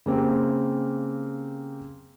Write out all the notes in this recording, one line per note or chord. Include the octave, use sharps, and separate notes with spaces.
C#3 A#3 C4 G4